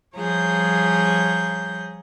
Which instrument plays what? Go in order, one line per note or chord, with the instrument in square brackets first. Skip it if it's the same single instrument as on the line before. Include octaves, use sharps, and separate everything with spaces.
[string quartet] F3 G3 G#4 C#5 A#5 G6